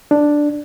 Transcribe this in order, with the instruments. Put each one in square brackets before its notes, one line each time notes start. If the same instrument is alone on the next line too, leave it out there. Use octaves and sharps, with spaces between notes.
[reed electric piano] D4